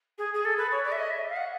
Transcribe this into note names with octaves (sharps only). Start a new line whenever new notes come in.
G#4
G#4
A4
B4
C#5
D5
E5
D#5
E5
F5
F#5